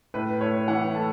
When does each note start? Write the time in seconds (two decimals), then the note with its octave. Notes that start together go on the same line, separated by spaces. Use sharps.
0.14 A2 B4
0.41 A2 C#5
0.68 E3 F#5
0.95 A3 A5